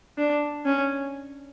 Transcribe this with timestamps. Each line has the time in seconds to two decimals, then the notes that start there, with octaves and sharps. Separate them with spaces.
0.18 D4
0.66 C#4